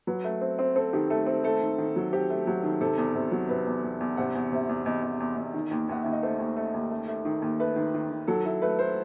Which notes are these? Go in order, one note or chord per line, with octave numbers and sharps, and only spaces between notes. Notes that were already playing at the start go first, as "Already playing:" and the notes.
F#3 B4
A3
C4
C4
C4 A4
D#3 G4
A3 A4
C4
A3 A4
D#3
D#3
F#3
C4 G4
A3
F#3
D#3
C3 A4
E2
C3
F#3
C3 B4
E2
E2
E2
C3 F#5
E2
C3 E5
E2
E2 D#5
E2
E2
E2
D#3
D#2
D#2 F#5
D#2 E5
D#5
A3 C5
D#2
A3
D#2
A3
A3
D#3
D#2
A3 B4
D#3
D#3
D#3
F#3 A4
E4 A4
A3 B4
A3 C5